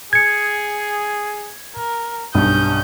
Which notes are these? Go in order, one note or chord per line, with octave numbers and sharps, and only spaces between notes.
G#4 G#6 C#7
A#4
B1 G2 G3 C#4 D#6 G6